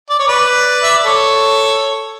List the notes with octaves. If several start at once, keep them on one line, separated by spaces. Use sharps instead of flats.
D5
C#5
B4 D5
E5
D5
A4 C#5